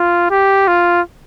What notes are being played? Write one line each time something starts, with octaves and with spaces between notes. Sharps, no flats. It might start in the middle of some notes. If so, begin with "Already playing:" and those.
Already playing: F4
G4
F4